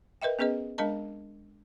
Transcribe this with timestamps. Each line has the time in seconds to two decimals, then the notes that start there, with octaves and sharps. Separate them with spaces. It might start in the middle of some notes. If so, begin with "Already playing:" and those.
0.22 A#4 B4 D#5 E5 G5
0.39 B3 C#4 G#4 B4 D#5
0.78 G#3 D4 A#4 D#5 A5